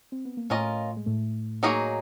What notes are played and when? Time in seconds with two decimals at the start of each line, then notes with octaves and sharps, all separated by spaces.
0.12 C4
0.25 B3
0.37 A#3
0.50 A2 A3 C#4 F4 A#4 D#5
0.97 G#3
1.06 A2 A3
1.63 F#3 A#3 D#4 G#4 C#5